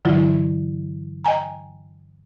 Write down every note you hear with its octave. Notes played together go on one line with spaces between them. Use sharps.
G2 D3 E3 F#3 E4 F4
D#5 G5 G#5 A#5